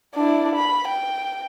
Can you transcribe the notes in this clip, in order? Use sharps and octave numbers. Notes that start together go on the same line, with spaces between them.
D4 E4
B5
G5